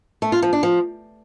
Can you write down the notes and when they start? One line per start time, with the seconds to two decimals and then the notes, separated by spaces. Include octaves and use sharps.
0.22 A3
0.32 F4
0.42 F3
0.53 D4
0.63 F3